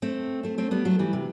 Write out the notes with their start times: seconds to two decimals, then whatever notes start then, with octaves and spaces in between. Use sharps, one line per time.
0.02 A3 C4
0.43 A3 C4
0.58 A3 C4
0.71 G3 B3
0.85 F#3 A3
0.99 E3 G3
1.13 C3